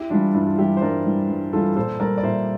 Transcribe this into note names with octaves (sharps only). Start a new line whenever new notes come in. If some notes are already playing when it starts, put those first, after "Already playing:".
Already playing: E4 G4
E3 G3 D4 F4
G2 E4
F4
E3 G3 E4 G4
C5
G2 A#4 D5
E3 G3
G2
E3 G3 F4 A4
A#2 A4 C5
G3 A#4 D5
D5
A#2 C5 E5